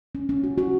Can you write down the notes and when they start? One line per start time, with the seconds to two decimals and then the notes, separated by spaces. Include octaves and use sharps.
0.15 C#4
0.29 C#4
0.44 F#4
0.58 F#4